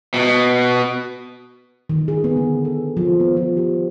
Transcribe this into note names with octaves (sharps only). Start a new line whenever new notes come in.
B2
D#3
G#4
B3
D3
A4
F3
B3
F3
G4